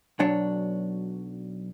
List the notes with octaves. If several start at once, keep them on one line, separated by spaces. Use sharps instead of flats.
B1 F#3 D4 C#5